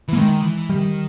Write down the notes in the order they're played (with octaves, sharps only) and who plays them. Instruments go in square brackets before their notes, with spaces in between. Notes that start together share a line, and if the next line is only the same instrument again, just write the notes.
[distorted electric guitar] E3
[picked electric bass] A#3
[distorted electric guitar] D#3 [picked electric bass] G#3
[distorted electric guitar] E3
[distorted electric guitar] D#3 [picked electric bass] G3